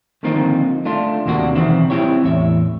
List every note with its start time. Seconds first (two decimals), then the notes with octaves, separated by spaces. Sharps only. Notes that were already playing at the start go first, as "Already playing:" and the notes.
0.23 D3 D#3 F3 A#3 C4 D#4
0.85 A3 D4 F4
1.26 D#2 C3 A#3 D4 F#4
1.55 B1 D#3 E3 C4 E4
1.90 C4 C#4 E4 G4 C#5
2.24 E2 A2 C#5 E5